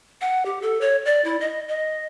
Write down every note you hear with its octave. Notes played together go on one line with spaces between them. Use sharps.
F#5
G4
A4
C#5
D5
E4
D#5
D#5